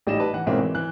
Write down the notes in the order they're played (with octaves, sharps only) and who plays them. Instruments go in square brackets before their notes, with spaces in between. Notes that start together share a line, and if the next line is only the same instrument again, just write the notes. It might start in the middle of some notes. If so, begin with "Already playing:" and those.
[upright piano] A1 G3 D#4 D#5 E7
B4 A5
E3 F#5
B1 G#2 C4 E4 A#4
E3
E3 F#6